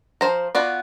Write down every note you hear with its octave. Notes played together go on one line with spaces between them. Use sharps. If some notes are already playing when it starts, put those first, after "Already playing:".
F3 C5 A#5
B3 F4 F#4 D5